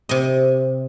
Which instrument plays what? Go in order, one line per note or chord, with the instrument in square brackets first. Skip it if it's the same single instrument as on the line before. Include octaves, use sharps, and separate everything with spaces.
[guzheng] C3 D#5